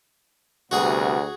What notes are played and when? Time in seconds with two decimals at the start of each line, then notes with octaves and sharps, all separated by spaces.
0.71 D2 C3 G3 B3 F#4 G#4 G#5